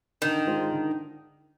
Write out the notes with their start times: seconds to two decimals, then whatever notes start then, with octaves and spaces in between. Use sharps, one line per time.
0.22 D3 D#3
0.47 G#3 D4 F4 C5
0.72 D3